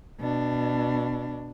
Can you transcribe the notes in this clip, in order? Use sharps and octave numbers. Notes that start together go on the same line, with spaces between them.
B2 D4